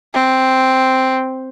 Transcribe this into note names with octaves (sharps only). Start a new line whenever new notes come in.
C4